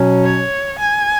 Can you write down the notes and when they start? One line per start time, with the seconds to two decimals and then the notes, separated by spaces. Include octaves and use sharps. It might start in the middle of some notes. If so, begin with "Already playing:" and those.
Already playing: B2 F#3 C#4
0.24 C#5
0.79 G#5